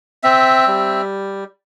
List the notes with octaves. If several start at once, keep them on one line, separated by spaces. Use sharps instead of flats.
C4 E5
G3